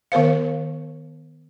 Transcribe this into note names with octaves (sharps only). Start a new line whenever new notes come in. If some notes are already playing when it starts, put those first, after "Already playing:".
D#3 B3 A#4 C5 F5